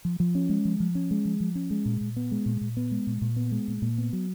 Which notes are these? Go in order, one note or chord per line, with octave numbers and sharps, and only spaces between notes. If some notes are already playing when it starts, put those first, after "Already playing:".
F3
F3
C#4
G#3
F3
F3
C#4
G#3
F3
F3
C#4
G#3
A#2
A#2
B3
G#3
A#2
A#2
B3
G#3
A#2
A#2
B3
G#3
A#2
A#2
B3
F#3